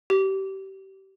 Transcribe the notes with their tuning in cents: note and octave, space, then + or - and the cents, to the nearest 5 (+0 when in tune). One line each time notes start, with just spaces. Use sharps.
G4 -25